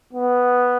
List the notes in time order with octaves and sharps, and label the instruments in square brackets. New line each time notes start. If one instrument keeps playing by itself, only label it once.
[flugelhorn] B3